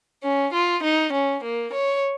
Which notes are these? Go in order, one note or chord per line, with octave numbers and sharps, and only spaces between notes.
C#4
F4
D#4
C#4
A#3
C#5